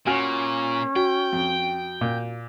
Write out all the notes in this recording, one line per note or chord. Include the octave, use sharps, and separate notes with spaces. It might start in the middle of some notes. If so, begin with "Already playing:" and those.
A#2 C#4 F#4 G#5 F6
F#4 G5
F2
A#2